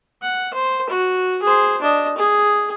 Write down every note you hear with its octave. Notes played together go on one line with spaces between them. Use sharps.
F#5
C5
F#4
G#4 C5
D4 D#5
G#4